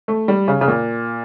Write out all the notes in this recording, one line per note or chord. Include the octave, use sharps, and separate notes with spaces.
A3
G3
C#3
C#3
A#2